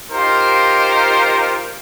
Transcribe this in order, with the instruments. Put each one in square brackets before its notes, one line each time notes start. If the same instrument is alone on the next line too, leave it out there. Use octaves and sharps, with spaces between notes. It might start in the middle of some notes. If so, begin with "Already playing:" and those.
[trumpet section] D#4 F4 G4 A#4 C5